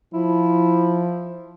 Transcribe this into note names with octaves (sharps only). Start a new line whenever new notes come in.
F3 E4